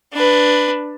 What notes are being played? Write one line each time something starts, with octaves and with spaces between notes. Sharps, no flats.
D4 B4